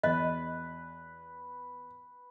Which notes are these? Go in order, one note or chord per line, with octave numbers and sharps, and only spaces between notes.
E2 B4 D#5